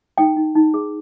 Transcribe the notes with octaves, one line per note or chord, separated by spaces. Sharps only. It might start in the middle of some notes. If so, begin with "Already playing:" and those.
D#4 G5
D#4
D#4
G#4